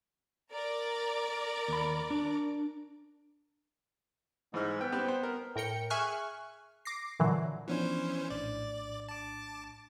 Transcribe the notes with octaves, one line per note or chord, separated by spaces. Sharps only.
A#4 D5 D6
D#2 B5
D4
G#2 E3 F6
B3 G5
C4 G4 B4
C5
A#4
A2 A#4 G5 C#7
G#4 E5 G#5 C#6 F6 F#6
D6 A#6 C7
A#2 D3 E3 F#3
E3 F3 B3 C#4 D4 C5
A#1 A2 D4 D5
A5 D6